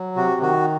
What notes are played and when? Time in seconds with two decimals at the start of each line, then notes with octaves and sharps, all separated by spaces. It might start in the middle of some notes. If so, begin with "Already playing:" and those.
Already playing: F#3
0.16 C3 F#4
0.41 D#3 F#4